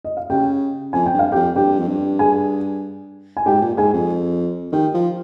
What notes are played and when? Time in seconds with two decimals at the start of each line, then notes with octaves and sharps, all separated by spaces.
0.05 D#5
0.17 F5
0.30 C#3 G4 G5
0.93 F2 G#5
1.06 G5
1.14 G2
1.19 F5
1.32 G4 G5
1.36 F2
1.56 G2 G4 G5
1.80 F2
1.88 G2
2.19 G#4 G#5
3.37 G#5
3.46 G#2 G4 G5
3.61 A#2
3.77 G#2 G#4 G#5
3.93 F2
4.72 D#3 G4 G5
4.94 F3